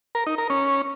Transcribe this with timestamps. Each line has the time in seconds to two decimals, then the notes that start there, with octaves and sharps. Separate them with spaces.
0.15 A#4
0.27 D#4
0.38 A#4
0.50 C#4